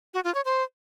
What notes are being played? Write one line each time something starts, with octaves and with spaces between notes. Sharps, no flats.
F#4
F4
C#5
C5